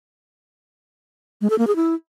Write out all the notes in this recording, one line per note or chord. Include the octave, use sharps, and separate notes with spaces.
G#3
A4
A#3
G#4
E4